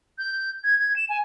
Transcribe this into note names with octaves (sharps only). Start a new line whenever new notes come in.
G6
G#6
G#6
E7
G#5